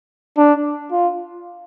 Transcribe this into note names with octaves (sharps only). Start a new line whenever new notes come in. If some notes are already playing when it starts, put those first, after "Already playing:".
D4
F4